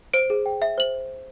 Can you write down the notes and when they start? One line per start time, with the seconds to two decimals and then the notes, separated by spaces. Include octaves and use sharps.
0.14 C5 D7
0.30 G#4
0.46 G5
0.62 E5
0.78 C5 F#7